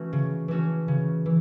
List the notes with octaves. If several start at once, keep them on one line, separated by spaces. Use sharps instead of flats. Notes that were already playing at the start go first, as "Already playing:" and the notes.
Already playing: E3 A3 C#4 F#4
C#3
E3 A3 C#4 F#4
C#3
E3